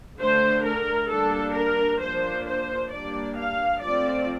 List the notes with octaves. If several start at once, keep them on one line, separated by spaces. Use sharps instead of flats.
D3 A3 D4 C5
A#4
G3 A#3 D4 A4
A#4
F3 A#3 D4 C5
C5
G3 A#3 D4 D5
F5
F3 A3 C4 D5